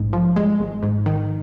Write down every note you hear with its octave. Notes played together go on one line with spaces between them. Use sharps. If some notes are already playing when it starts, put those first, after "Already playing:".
Already playing: A#1 G#2
F3
G#3
G#1
G#2
D#3